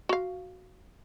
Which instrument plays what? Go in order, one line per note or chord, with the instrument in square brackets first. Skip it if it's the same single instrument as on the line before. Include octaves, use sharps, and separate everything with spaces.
[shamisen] F#4 F5